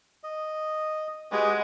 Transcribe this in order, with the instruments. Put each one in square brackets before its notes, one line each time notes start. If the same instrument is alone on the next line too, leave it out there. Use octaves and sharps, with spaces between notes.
[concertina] D#5
[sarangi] G#3 [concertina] F#4 G4 B4